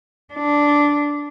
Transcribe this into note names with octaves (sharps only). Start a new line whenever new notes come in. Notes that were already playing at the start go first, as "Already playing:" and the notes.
D4